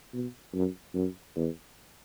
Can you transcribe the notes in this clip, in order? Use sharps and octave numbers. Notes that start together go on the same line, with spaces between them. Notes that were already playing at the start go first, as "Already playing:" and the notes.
B2
F#2
F#2
E2